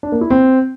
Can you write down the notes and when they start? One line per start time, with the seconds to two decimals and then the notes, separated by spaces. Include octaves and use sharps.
0.03 D4
0.12 A#3
0.21 E4
0.30 C4